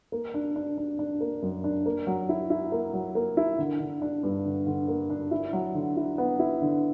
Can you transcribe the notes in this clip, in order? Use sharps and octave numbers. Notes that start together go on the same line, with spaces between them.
A#3
D4
D4
D4
D4
A#3
F#2
D4
A#3
F#3
E4
E4
A#3
F#3
A#3
E4
D3
D3
D4
G2
D3
D3
A#3
D4
E4
F#3
D3
E4
B3
E4
D3